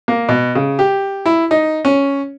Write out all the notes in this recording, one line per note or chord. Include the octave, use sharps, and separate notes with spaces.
A#3
B2
C#3
G4
E4
D#4
C#4